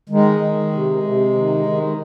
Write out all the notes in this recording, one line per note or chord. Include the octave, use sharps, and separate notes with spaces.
D#3 G#3
D#3
C3
C3
D#3
D#3